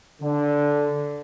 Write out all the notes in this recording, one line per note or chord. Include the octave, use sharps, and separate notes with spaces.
D3